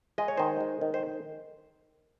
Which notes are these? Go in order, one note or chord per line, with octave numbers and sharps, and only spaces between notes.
G#3 D#5
C#5
D#3 C5 D#5
G#3
D#3
C5